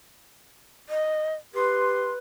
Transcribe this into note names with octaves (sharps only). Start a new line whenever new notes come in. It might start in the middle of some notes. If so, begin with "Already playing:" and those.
D#5
G4 B4 C6